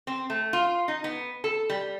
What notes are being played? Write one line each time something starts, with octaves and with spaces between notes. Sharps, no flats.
C4
A3
F4
D#4
B3
A4
G3